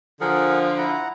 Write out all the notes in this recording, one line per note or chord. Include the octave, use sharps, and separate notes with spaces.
D3 F3 G#4 A#4 F#5
E4 F#5 A#5